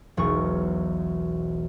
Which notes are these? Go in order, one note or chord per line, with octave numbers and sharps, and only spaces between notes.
E1 B1 C#6